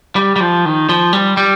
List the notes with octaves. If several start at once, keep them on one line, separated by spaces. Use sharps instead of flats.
G3
G3
F3
D#3
F3
G3
G3